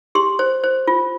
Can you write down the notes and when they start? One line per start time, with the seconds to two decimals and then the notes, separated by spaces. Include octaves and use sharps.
0.15 G4 C6
0.39 C5
0.64 C5
0.87 F4